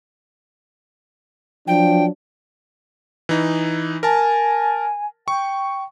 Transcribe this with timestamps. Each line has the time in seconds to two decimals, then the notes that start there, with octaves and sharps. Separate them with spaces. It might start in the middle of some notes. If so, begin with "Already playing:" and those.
1.67 F3 F#3 D4 G5
3.29 E3 D#4
4.03 A#4 G#5 A5
5.28 G5 C#6